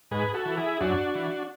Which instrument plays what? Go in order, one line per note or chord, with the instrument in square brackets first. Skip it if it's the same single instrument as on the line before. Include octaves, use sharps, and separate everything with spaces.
[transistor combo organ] G#2 G#4 B4
F#4 A4
E3
E4 G#4
F#2 D4 F#4
E3